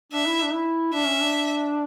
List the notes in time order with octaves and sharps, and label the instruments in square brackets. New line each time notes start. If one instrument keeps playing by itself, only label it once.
[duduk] D4 [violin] E5
[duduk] E4
D4
E4
[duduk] D4 [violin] E5
[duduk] C#4
D4